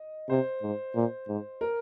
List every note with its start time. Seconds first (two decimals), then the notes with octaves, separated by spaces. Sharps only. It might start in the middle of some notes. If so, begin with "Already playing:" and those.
Already playing: D#5
0.29 C3 C5
0.62 G#2
0.95 A#2
1.28 G#2
1.61 A#4